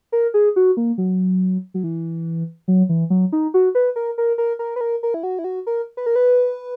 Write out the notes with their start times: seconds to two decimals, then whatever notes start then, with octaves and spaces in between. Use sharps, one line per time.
0.12 A#4
0.34 G#4
0.56 F#4
0.77 A#3
0.98 F#3
1.74 F#3
1.84 E3
2.68 F#3
2.89 E3
3.10 F#3
3.32 D#4
3.54 F#4
3.75 B4
3.96 A#4
4.18 A#4
4.38 A#4
4.59 A#4
4.76 B4
4.81 A#4
5.03 A#4
5.14 E4
5.23 F#4
5.39 E4
5.44 F#4
5.67 A#4
5.97 B4
6.06 A#4
6.16 B4